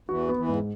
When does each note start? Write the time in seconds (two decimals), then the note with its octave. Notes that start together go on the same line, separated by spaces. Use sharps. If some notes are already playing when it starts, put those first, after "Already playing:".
0.09 E2 E3 F#4
0.29 B3
0.38 E2 E3
0.49 G#2